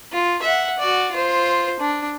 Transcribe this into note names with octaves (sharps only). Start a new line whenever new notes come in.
F4
E5 F#5
F#4 D5
F4 C5
D4